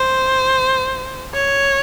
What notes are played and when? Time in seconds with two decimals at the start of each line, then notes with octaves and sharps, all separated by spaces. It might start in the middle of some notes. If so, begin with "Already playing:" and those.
Already playing: C5
1.34 C#5